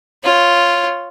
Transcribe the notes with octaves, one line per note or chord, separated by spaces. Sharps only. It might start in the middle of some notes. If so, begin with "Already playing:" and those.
F4 C#5